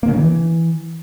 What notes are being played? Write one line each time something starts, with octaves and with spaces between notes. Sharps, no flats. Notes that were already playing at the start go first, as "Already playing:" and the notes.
A#3
C#3
D#3
E3